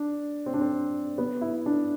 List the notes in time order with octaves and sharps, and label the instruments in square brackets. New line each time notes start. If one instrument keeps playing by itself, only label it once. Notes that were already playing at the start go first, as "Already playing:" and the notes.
Already playing: [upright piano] D4
C4
D4
C4
B3
E4
D4